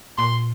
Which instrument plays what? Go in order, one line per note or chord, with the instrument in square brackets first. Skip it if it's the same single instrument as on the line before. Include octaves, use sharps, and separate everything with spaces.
[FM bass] A#2 [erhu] C6